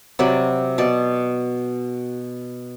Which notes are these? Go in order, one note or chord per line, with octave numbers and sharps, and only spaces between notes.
C3 F#3 D5 B5
B2 D5